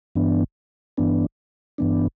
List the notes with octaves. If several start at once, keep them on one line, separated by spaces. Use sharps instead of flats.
G2 E3 B3 D4
G2 E3 B3 D4
G2 E3 B3 D4